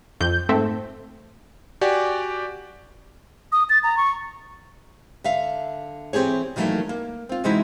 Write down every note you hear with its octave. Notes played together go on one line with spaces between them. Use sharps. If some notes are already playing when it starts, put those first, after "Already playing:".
F2 G6
G#2 A3 C4
F#4 G4 D5 G#5
D#6
A6
A#5
C#6
D3 E5 F5
E3 C4 G4 G#4 C#5
D#3 E3 F#3 A3 A#3 E4
A#3
C4 F4
C3 E3 G#3 D#4 E4 F#4